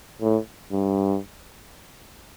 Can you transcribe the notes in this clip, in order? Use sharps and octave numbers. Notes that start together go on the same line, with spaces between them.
A2
G2